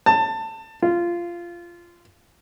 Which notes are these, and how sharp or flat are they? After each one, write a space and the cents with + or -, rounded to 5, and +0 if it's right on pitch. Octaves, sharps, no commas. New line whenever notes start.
A5 +20
F4 -15